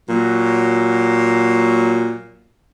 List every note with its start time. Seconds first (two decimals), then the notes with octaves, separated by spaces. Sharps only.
0.10 A#2 F#3